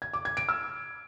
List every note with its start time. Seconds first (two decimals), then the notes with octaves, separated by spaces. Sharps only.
0.02 G#6
0.13 D6
0.25 G#6
0.37 D7
0.49 E6